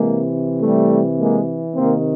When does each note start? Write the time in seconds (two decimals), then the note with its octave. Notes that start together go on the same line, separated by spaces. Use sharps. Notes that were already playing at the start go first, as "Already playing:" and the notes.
Already playing: C3 E3 G#3 A#3
0.62 G3 A3
1.19 G#3 A#3
1.75 C3 D#3 A#3 C4